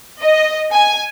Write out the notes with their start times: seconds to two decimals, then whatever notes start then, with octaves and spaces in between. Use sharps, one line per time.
0.21 D#5
0.73 G#5